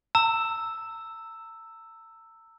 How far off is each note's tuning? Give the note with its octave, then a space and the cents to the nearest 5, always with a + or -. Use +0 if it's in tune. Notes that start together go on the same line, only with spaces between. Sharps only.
A#5 -40 E6 +0